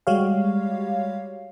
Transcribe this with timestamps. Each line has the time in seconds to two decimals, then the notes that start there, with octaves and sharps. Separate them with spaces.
0.07 G3 G#3 F#4 G4 C#5 F5